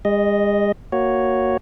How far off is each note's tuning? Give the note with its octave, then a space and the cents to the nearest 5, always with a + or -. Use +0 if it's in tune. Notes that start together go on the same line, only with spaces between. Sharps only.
G#3 -40 D#5 +0
A#3 +0 F#4 +0 C#5 +0